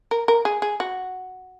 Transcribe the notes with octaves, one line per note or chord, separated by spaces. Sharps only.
A#4
A#4
G#4
G#4
F#4